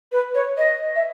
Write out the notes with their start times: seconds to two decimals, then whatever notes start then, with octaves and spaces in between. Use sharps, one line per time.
0.12 B4
0.34 C#5
0.57 D#5
0.95 E5